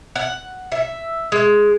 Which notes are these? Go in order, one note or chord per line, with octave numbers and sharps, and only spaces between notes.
F#5
E5
G#3